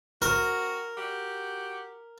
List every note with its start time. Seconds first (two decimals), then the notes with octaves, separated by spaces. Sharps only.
0.22 C4 F#4 A#4
0.98 F#4 G4